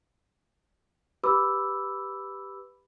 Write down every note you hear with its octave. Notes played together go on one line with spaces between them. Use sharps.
G4 B4 B5 D6 E6